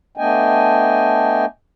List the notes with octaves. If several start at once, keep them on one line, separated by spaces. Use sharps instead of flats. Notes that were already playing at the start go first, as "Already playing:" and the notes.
A3 B3 D4 D#5 G5 G#5